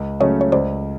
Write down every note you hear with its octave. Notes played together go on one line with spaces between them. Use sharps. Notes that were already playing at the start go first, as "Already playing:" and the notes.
Already playing: C#2
C#3 F#3 A3 C#4 C#5 D#5
C#5
C#2 C5 D5